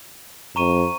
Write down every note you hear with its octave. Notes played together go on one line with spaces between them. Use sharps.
F2 A#5 C#6 D#7